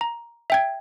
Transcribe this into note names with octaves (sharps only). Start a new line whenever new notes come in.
A#5
E5 G5 G#6